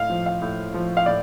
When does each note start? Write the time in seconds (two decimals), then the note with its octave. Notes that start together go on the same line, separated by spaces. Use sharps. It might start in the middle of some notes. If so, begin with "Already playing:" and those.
Already playing: A2 F5
0.10 F3
0.26 F5
0.42 A2
0.74 F3
0.97 F5
1.06 A2 D5